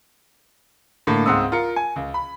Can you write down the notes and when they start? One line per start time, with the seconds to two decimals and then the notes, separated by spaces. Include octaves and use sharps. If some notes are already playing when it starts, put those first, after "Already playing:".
1.07 A2 D3 A#3
1.26 C#2 G#2 C4 F#5 D#6 E6
1.52 F4 A#4 C#7
1.76 G#5
1.96 C#2
2.14 B5